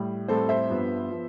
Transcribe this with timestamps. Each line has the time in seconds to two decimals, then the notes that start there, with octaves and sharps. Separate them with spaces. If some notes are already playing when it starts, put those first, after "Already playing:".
Already playing: A2 G3
0.28 A2 G3 C4 A4 C5
0.49 C5 E5
0.69 G2 F3 B3
1.10 F3 B3